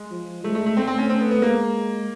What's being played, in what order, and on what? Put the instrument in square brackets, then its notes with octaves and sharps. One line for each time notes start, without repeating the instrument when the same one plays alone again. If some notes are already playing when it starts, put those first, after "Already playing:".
Already playing: [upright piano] G#3
[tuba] F3
[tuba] G#3 [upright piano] A3
[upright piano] A3
A3
[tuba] A3 [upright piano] C4
[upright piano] C4
C#4
C4
B3
B3
[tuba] G#3 [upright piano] A#3